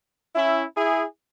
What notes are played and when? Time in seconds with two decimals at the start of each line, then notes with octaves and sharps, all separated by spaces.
0.35 C#4 E4
0.75 E4 G#4